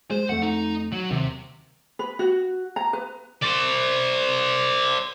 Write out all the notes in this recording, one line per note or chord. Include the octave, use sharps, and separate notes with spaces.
G#3 C5
F2 A3 F#5
D#4
F#3
D#2 C3
B4
F#4
A#5
B4
C5 D5